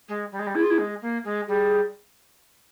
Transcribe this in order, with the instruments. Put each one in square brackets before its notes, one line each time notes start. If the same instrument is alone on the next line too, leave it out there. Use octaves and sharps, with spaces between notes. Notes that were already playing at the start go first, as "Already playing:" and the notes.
[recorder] G#3
G3
G#3
G3
[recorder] E4 [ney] G#4
[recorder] F4
E4
G#3
A#3
G#3
[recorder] G3 [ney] G#4